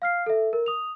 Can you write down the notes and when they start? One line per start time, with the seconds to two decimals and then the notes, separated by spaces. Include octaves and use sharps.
0.02 F5 F6 C7
0.26 A4 E5
0.53 A#4
0.66 D#6 F7